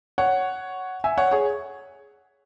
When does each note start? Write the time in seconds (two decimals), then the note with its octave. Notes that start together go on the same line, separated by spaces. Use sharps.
0.18 C#5 F#5
1.04 E5 G#5
1.17 C#5 F#5
1.31 G#4 C#5